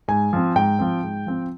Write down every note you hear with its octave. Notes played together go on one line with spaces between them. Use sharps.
G#2 G#5
F3 C4
G#2 G5
F3 C4
G#2
F3 C4